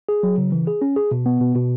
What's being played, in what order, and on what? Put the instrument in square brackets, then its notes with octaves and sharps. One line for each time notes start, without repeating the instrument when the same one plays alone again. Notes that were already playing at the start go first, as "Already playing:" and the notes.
[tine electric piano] G#4
F#3
C#3
E3
G#4
C#4
G#4
B2
B3
B2
B2